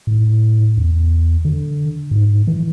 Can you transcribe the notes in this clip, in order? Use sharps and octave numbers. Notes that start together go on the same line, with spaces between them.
A2
E2
D3
G#2
E3